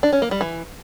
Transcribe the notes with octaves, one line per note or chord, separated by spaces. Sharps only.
D4
C#4
A#3
G3
E3